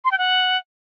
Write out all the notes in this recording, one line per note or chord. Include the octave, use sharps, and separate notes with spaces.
C6
G5
F#5